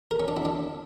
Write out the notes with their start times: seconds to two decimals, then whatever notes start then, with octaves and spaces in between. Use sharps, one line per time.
0.11 A#4
0.20 C#4
0.28 D4
0.37 E4
0.45 D4